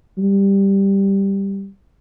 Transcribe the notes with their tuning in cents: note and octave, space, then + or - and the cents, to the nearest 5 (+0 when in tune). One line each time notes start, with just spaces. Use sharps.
G3 +5